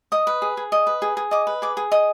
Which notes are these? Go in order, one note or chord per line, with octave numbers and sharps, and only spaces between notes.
D#5 D#6
B4
G#4
G#4
D#5
B4
G#4
G#4
D#5 D6
B4
G#4 D6
G#4
D#5 D#6